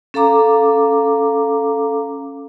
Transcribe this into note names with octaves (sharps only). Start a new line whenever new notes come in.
C#4 A4 F5 A#5 D6